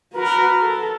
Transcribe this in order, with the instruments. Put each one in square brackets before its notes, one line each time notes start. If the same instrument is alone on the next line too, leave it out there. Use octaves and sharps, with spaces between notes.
[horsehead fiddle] F#4 B4 [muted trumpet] A#4
[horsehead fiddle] A4